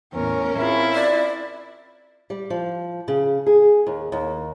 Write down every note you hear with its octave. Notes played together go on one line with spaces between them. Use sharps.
E2 A2 C#4 A#4
C4 E4 F4 G#4
D5
G3
F3
C#3
G#4
D#2
D#2